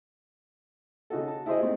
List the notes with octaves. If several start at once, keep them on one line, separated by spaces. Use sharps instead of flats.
C#3 D#4 F#4 A4
A5
E4 G#4 C5 D#5
G#3 A3 C4 D#4